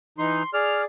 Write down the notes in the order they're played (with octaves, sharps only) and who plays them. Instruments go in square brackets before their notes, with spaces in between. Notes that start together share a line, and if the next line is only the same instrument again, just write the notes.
[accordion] E3 D#4 [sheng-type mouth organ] C6
[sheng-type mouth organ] G#4 D5 [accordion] F6